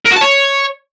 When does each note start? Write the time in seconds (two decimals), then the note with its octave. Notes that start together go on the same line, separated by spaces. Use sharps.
0.06 A#4
0.11 F#4
0.16 A5
0.22 C#5